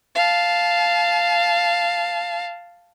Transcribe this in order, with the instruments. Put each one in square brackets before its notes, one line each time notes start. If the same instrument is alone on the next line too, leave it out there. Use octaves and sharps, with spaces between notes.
[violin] F5 A5